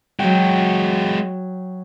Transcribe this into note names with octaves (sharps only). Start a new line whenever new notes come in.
F#3 G#3 F#4 G5